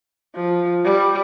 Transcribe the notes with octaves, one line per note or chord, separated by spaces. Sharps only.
F3
G3